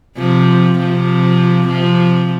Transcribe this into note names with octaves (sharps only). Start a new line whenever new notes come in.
C3 F3
C3 F3
C3 F3